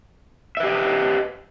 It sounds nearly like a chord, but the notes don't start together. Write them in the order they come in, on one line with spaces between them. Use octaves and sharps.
E5 B4 G4 D#5